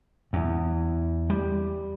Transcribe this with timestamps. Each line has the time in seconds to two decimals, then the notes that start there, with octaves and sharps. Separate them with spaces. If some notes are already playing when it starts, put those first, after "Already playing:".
0.33 E2
1.30 G3